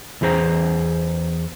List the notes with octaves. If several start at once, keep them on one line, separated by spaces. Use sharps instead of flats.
E2 E3 G#4 C5 A#5